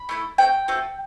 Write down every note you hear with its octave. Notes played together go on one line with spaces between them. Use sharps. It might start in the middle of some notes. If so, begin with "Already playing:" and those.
Already playing: B5
A3 E4 A4
A3 C4 F#4 G5
A3 C4 F#4 A4